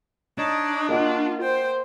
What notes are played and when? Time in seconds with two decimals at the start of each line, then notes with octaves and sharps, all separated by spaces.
0.38 D4 D#4 C#5 D#5
0.89 A#3 F4 F#4 D#5 F#5
1.42 C5 G5